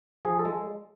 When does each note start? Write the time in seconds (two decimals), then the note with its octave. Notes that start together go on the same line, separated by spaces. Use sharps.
0.25 F3 G#4
0.39 A4
0.45 G#3